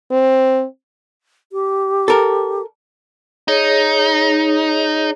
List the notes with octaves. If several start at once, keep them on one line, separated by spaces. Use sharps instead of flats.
C4
G4
A4 A#4
D#4 G#4 C#5